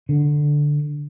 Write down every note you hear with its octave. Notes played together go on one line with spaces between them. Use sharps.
D3